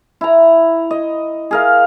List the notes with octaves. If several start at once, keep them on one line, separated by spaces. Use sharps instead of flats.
E4 A#5
D#5
G#4 A#4 F5